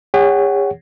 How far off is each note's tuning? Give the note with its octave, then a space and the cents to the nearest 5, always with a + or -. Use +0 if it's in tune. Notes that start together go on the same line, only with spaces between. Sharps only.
G#4 -45 C#5 +5 F#5 +15